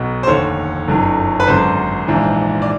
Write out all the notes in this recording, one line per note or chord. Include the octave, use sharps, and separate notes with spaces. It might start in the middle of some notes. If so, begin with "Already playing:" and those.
Already playing: B1 B2
C5
F1 D#2 D3 C#5
G1 F#2 D#3
B4
G#1 F#2 D3 C5
A#1 G#2 E3
D5